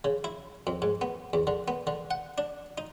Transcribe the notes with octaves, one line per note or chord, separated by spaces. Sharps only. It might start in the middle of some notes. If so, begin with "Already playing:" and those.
C#3
E4
F2
G#2
B3
E2
D3
B3
D3
F#5
D4
D#4